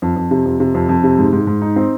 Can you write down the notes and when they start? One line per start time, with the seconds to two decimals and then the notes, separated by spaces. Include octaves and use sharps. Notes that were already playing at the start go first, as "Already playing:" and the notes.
0.02 F2
0.16 F2
0.31 C3
0.46 F2
0.60 C3
0.75 F2
0.89 F2
1.04 C3
1.18 G#2
1.32 G#2
1.47 G#2
1.62 D#4
1.76 C4